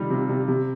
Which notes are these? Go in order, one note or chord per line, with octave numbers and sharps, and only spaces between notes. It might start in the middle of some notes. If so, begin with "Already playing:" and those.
Already playing: C3 D#3 G3 F4
C3
C3
C3